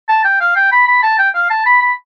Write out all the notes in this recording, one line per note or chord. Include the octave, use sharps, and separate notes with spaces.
A5
G5
F5
G5
B5
B5
A5
G5
F5
A5
B5
B5